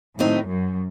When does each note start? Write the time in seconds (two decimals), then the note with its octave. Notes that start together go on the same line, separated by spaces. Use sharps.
0.19 A2 D#3 F#3 C4 D#4
0.47 F#2